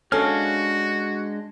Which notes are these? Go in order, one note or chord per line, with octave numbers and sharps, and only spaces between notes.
G#3 C#4 D4 F#4 A4 F5 A5 F6